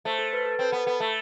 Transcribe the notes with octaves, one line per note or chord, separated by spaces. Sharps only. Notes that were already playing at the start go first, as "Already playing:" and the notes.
A3 C5
A4
B4
A4
C4 B4
B3
B3 A4
A3